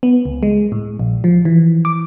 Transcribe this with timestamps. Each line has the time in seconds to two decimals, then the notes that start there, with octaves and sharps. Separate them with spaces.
0.03 B3
0.25 C#2
0.43 G#3
0.72 A2
0.99 A#1
1.24 F3
1.45 E3
1.85 D6